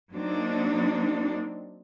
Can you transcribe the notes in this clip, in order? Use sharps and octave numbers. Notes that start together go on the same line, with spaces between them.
F#3 A#3 C4 D4 D#4